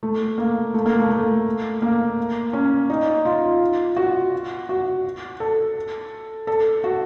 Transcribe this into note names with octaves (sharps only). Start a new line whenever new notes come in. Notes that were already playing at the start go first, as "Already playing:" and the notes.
A3
A#3
A3
A#3
A3
A3
A#3
C#4
D#4
F4
F#4
F#4
A4
A4
F#4